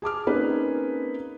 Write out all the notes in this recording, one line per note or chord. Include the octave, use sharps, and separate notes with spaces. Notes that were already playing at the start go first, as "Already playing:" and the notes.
G#4 A5 D6 F6
A#3 C4 C#4 D#4 G#4 B4